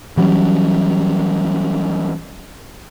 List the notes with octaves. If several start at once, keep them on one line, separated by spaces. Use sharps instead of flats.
E3 F#3 G3 C#4